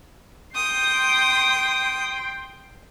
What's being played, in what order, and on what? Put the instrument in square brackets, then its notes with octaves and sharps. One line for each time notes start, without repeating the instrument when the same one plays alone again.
[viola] G5 C6 [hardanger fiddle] D#6